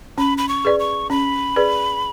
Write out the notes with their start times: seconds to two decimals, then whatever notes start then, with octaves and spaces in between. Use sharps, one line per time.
0.18 C#4 B5
0.38 B5
0.49 C#6
0.65 G#4 B4 D5
0.80 C#6
1.10 C#4 B5
1.56 G#4 B4 D5